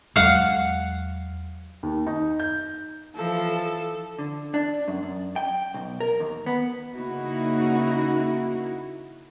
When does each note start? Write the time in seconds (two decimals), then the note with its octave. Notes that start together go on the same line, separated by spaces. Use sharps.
0.16 E2 F#3 G#3 F5 F#5
1.83 D#2
2.07 D#4
2.40 G6
3.16 E3 F3 A4
4.19 D3
4.54 D4
4.88 F#2
5.03 F#2
5.36 G5
5.74 B1
6.00 A#4
6.20 D#2
6.46 B3
6.94 C#3 A#3 D#4 E4 F#4